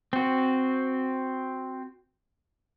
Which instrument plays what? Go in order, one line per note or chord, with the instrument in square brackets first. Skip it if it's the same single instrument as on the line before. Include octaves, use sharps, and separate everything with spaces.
[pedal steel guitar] C4 F#4